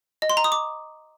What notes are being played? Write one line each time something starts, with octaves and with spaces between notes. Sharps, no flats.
D#5
C6
A#5
D#6
D6